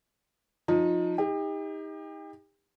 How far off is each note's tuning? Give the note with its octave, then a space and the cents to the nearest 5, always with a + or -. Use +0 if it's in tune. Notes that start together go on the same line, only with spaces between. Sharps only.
F3 +25 D#4 +0
D#4 +25 G4 +35